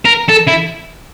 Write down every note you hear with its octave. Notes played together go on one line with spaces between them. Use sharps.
A#4
A4
E4